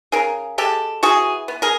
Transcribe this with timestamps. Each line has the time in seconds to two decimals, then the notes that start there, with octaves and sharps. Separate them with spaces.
0.12 C#3 G#4 A#4
0.58 G#3 G4 A4
1.03 E3 F#4 G#4
1.48 B3
1.62 G#4 A#4